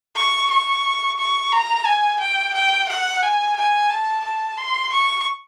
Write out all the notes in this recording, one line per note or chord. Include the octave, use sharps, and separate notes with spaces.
C#6
C#6
C#6
A#5
G#5
G5
G5
F#5
G#5
G#5
A5
A5
C6
C#6